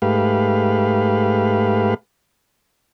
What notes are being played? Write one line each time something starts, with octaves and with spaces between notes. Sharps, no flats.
G#2 A3 G4 B4 F5